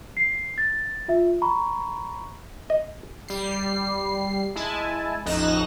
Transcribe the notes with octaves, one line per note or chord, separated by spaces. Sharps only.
C7
A6
F4 E5
A#5 B5 C#6
D#5
G3 C7
G#3 E4 G#5 A5
A1 F2 D#4 F#6 A#6 E7